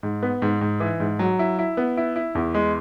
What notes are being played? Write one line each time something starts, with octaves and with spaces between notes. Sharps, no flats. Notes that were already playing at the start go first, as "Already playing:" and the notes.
G#2
B3
G#2
G#2
E3
G#2
F#3
E4
E4
B3
E4
E4
E2
G#3